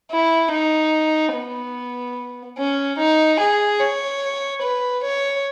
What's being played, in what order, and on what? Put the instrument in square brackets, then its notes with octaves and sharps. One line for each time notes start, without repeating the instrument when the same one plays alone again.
[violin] E4
D#4
B3
C#4
D#4
G#4
C#5
B4
C#5